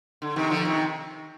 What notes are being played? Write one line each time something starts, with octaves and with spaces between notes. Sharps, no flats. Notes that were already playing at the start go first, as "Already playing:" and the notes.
D3
C3 D#3
D3 F3
C3 D#3